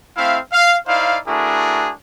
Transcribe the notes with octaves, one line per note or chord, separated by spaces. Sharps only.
A3 C4 E4 E5 F5
F5
D#4 E4 C5 D5 F5
A3 D4 E4 F#4 G#4 A#4